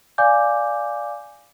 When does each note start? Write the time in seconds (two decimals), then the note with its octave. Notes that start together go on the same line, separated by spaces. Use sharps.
0.18 D5 F5 G#5 D6 G6